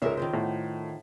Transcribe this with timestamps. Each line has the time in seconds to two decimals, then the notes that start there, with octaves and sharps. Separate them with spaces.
0.02 C#2 G#3 D#4 A#4 C5 E5
0.17 D#3 F4 C5
0.33 A2 F#5